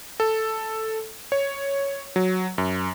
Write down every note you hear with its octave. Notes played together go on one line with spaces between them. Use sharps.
A4
C#5
F#3
F#2